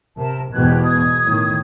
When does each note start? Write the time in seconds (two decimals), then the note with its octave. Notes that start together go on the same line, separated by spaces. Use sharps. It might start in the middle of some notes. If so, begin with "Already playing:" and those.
0.17 C3 A#4 E5 A5
0.52 E2 G#2 B2 G4 F#6 G#6
0.83 D#6 G#6
1.24 A2 D#3